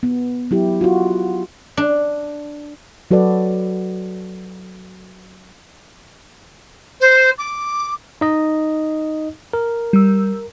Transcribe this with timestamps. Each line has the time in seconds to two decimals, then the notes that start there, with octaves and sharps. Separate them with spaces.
0.03 B3
0.51 F#3 E4 G4
0.81 F4 F#4
1.77 D4
3.11 F#3 F#4 A4 B4 D5
7.01 C5
7.38 D6
8.21 D#4 D#5
9.53 A#4
9.93 G3 E6